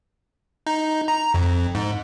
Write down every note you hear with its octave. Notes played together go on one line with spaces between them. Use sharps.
D#4
A#5
F2
G#2